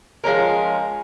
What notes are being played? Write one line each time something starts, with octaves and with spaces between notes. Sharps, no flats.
F3 G#3 C#4 A#4